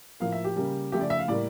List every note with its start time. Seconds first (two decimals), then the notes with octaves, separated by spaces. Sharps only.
0.20 A2 F3 A#3 F5
0.32 E5
0.44 G4
0.56 C#3 G3 A#3
0.92 C#3 F3 A3 G4
1.01 D5
1.10 E5
1.19 F5
1.28 A2 G3 A#3 D5